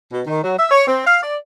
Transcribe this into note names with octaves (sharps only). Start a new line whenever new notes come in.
B2
D#3
F#3
E5
C#5
C4
F5
D5